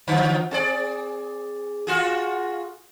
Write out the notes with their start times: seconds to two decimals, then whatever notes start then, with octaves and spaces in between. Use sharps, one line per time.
0.08 D3 F3 F#3
0.51 C4 G#4 D5
1.87 F4 F#4 G#4